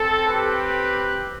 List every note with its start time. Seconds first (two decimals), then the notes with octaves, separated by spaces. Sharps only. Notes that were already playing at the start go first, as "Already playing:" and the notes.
Already playing: C4 A4
0.28 G4 B4